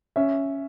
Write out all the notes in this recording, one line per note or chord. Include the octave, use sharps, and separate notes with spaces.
C#4 E5